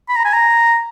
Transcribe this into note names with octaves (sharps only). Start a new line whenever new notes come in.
B5
A#5
G#5
A#5